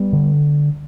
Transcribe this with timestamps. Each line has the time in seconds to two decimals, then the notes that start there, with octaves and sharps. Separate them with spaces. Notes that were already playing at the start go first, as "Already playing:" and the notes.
Already playing: G3 B3
0.12 D3